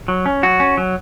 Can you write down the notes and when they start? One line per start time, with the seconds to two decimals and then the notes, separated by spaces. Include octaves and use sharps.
0.08 F#3
0.26 C#4
0.43 F#3 F#4
0.60 C#4
0.77 F#3